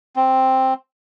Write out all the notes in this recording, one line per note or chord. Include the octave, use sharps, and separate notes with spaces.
C4